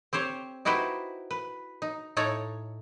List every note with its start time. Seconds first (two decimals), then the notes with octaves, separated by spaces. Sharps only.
0.13 C4 G4 C5 C#5
0.65 D#4 E4 F#4 G4 B4 C5
1.31 B4
1.82 D#4
2.17 A2 D#4 A4 C#5 A#5